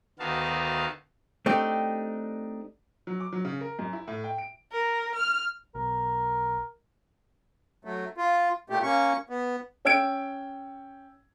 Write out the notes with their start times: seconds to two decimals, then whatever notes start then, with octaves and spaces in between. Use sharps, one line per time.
0.19 D2 D#3 B3 F#4 F5 A5
1.46 A3 C4 D4 D#4 G4
3.07 F#3
3.20 D6
3.33 F#3
3.45 C#3
3.61 A#4
3.79 F#2
3.93 E4
4.08 A2
4.24 G5
4.38 D7
4.72 A#4
5.15 F6
5.75 B1 A#4
7.85 F#3 A3
8.18 F4
8.70 A#2 A3 G4
8.83 A#3 C#4 C#6
9.30 B3
9.85 C#4 G5 E6 G#6 D7